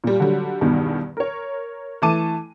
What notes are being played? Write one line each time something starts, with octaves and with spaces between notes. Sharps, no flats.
A#2 G3
D3 F#3 G3
E2 G2 B2 D#3
A#4 C#5
E3 A3 A5 D6 D#7